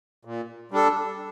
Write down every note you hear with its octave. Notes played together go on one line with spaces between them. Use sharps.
A#2
G3 D4 A4